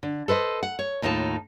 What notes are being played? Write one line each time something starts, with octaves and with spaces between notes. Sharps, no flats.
D3
A4 B4 C5 D#5
F#5
C#5
D#2 A2 D#4 F4 A5